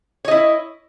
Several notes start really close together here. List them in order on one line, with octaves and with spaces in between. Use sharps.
C#5 D#5 E4